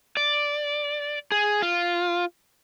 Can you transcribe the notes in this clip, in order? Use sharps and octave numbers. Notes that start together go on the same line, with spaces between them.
D5
G#4
F4